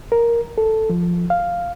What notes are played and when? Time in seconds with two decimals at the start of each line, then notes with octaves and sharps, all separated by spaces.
0.12 A#4
0.58 A4
0.90 F3
1.30 F5